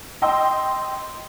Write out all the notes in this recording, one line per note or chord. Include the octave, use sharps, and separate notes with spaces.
D#5 G5 C6 E6